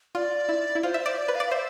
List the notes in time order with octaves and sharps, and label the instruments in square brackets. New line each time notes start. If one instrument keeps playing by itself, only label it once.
[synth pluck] F4 [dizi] D5
[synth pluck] E4
E4
[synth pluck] F4 [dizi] C5
[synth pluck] E5
[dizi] C5
[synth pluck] D5
[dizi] D5
[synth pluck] B4
[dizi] F5
[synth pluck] D5
[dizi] F5
[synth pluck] C5 [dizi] E5